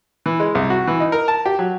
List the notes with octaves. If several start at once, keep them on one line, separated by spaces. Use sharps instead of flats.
E3
G#3
C2
F#4
E3
D#4
A#4
A5
G4
F#3